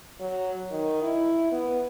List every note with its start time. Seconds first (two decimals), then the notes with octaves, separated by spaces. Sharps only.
0.20 F#3
0.71 D#3
1.02 E4
1.52 B3